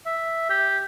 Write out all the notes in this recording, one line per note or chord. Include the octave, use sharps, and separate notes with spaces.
E5
G4